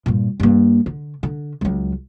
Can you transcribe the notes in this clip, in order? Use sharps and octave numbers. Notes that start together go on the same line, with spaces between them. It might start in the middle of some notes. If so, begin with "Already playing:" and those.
G2 A#2
G2 A#3
D3
D3
C#2 F#3